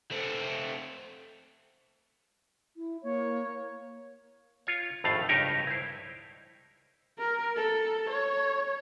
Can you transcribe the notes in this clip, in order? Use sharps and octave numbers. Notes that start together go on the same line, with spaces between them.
A3 C4
E4
A#3 C#5
F4 C#5
G#1 F2 A2 A3 F5
C#2 G2 D#4 G4 A#4 C#5
E4 C5
A#4
A4
C#5